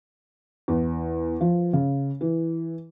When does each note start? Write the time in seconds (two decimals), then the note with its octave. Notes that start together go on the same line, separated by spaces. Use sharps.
0.68 E2
1.41 F3
1.73 C#3
2.21 E3